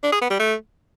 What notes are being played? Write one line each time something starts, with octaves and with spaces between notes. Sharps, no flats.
D4
G#4
B3
G3
A3